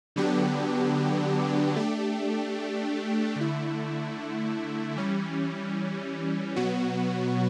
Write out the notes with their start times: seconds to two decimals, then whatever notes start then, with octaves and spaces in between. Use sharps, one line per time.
0.16 D3 F#3 B3 D4 G4
1.76 A3 D4 G4
3.36 D3 A3 E4
4.96 E3 G3 C#4
6.56 B2 F#3 B3 F#4